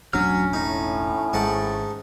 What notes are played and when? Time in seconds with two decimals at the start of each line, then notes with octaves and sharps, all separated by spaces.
0.13 E1 A1 F#3 C#4 D4 F6
0.53 A2 D#4
1.33 G#1 G#2 F#5 A5